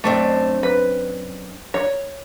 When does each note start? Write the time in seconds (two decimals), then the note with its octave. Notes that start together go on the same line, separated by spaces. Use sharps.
0.04 F#2 A3 C4 D4
0.63 B4
1.74 C#5